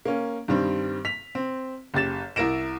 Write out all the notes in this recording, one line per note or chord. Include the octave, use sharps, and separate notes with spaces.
A#3 C#4
G2 D#3 G3 C4
B6 F7
C4
F#1 G4 A6 E7
C2 E4 A#4 A#6 D7 E7